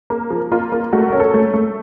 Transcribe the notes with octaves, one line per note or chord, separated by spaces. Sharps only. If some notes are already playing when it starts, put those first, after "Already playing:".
A#3
F3
A#3 F4
A#3
A3 F#4
C#4 A#4
A4
A3
A3